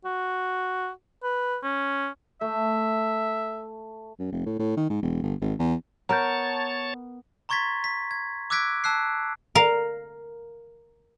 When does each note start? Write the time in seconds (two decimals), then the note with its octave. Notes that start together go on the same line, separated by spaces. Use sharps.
0.05 F#4
1.23 B4
1.63 C#4
2.41 A3 E5
4.19 F#2
4.32 F1
4.46 A2
4.59 A2
4.77 D#3
4.90 G#2
5.03 E1
5.23 G1
5.41 G#1
5.59 E2
6.09 B3 A#4 C#5 A5 A#5 G6
7.49 A#5 C6 C#6 G#6 A6 B6
7.84 B6
8.11 G#6
8.50 D6 E6 F#6 G#6 B6 D7
8.84 A5 E6 F#6 C7
9.55 A#4 F5